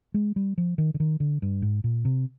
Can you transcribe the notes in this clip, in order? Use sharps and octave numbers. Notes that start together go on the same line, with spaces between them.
G#3
G3
F3
D#3
D3
D#3
D3
G2
G#2
A#2
C3